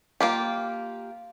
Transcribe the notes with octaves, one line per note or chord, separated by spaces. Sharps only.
A#3 F4 G4